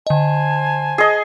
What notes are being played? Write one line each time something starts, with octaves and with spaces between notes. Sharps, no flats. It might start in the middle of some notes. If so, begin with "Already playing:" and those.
D3 C5 D#5 G#5 A5
G#4 D#5